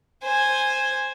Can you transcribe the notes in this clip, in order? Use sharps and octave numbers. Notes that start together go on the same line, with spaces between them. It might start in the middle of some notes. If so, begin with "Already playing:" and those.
C5 G#5